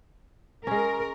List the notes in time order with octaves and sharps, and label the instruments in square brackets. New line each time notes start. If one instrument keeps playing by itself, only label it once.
[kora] G#3 C#4 [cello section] A#4